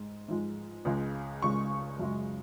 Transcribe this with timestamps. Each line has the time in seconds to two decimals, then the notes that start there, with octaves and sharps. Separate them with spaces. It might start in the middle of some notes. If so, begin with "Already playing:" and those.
Already playing: G#2 G#3
0.28 G#2 F3 G#3
0.85 C#2 C#3 G#3
1.42 C#2 C#3 G#3 C#6
1.99 F#2 C#3 G#3